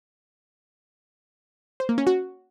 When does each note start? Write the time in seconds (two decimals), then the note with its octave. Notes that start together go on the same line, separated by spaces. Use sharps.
1.80 C5
1.89 A#3
1.98 C#4
2.07 F#4